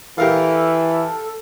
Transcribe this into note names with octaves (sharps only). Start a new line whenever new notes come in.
E3 G4 A4 A#4 F5